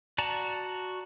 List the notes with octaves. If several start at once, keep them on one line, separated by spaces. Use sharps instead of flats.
F#4 D5 A5 A#5